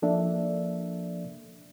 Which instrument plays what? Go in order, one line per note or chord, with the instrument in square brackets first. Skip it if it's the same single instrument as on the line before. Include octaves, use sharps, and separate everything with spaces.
[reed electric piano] F3 A#3 D4 A4 D5 E5